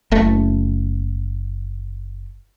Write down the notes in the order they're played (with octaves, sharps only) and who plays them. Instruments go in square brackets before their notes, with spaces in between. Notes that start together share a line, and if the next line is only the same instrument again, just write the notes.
[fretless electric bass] F#1 A3